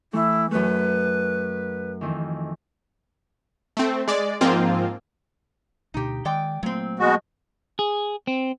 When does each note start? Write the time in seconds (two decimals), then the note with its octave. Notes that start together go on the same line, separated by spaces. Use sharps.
0.13 E3 A3 E4
0.51 F#2 A3 B4
2.01 F2 D#3 E3
3.77 A3 C4
4.08 G#3 D5
4.41 G#2 F3 A#3 C4 F4
5.94 D2 B2 D#4 G4
6.25 D#3 G#3 D5 G5
6.63 A#2 F#3 A3 A#3 C4
6.99 B2 G#3 F#4
7.79 G#4
8.27 C4